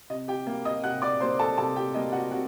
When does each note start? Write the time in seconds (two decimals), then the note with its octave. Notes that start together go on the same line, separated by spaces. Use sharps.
0.10 C3 D#5
0.28 G4 G5
0.47 G3 A#3
0.65 D#5 D#6
0.83 C3 F#5 F#6
1.02 D5 D6
1.20 G3 A#3 C5 C6
1.39 A4 A5
1.58 C3 A4 A5
1.76 G4 G5
1.94 G3 A#3 D#5
2.12 F#4 F#5
2.31 C3 F#4 F#5